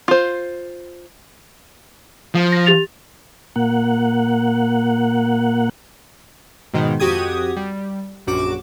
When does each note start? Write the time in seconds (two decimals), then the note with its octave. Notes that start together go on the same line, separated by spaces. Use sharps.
0.08 F4 C5
2.34 F3
2.52 A#6
2.66 G4 A6 F7
3.56 A#2 A#3 F#5
6.74 G#2 B2 D#3 G#3
7.00 F2 F#4 G4 D#6 G#6
7.57 G3
8.27 A#1 F#2 F#4 D6 E7